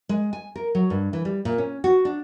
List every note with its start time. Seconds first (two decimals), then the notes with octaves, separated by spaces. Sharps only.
0.09 G#3
0.33 G#5
0.56 A#4
0.75 F#3
0.90 G2
1.13 E3
1.25 G3
1.45 A#2
1.58 C#4
1.84 F#4
2.05 D4